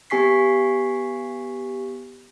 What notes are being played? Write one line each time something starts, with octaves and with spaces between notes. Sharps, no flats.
B3 G4 G#5 C#6 B6 C7